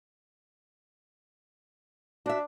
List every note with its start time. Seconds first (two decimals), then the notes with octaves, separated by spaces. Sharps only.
2.26 D4 F#4 E5